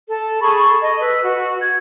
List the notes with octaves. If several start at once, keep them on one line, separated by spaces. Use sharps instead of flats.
A4
G#4 A4 B5 C#6
D#5
B4 E6
F#4
G#6